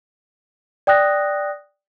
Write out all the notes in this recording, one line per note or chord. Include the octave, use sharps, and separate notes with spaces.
D5 G5 D#6 F#6 A#6